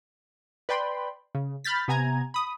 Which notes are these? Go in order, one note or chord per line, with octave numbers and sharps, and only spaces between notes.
B4 D5 G5 B5 C6
C#3
B5 F6 G6 A6 B6
C3 B3 G#5 A#5 G#6
B5 D#6